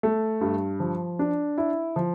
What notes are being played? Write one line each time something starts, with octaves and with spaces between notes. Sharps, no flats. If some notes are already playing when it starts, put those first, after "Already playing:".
A3
G2
F3
D4
E4
F3